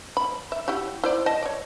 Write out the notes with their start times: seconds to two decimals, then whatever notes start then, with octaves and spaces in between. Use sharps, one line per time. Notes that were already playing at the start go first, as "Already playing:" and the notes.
0.17 B5
0.52 E5
0.68 E4 F#4 G4
1.04 E4 C5 D5
1.26 D#5 A5
1.43 C#5 D5